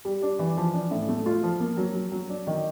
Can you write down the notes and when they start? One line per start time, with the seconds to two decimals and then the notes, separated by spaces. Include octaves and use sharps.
0.05 G3
0.22 D4
0.39 E3
0.57 F3
0.74 D4
0.91 A2
1.09 A3
1.26 F4
1.43 F3
1.60 A#3
1.77 F#3
1.95 F#3
2.12 F#3
2.29 D4
2.47 D#3